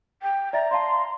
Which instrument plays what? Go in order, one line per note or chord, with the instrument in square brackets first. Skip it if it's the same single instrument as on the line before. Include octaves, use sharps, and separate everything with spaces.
[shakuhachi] G5
[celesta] D5 E5 A6 [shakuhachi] A#5
[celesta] D5 F5 A5 [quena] C6